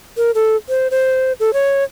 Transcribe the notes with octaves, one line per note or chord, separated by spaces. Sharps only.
A#4
A4
C5
C5
A4
C#5